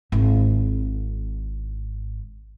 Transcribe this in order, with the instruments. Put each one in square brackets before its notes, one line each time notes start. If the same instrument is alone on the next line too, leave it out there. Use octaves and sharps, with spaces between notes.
[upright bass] G#1 E4